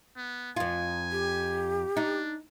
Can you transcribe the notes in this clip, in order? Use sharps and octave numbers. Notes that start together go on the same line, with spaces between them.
B3
F2 F4 G#5
G4
D4 D#4